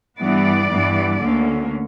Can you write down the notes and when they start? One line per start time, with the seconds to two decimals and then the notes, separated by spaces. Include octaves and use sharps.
0.20 G2 E3 B3 D5
0.71 G2 E3 B3
1.21 D2 D3 A#3 C#4